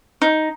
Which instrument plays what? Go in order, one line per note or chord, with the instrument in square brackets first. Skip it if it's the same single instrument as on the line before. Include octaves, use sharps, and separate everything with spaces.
[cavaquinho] D#4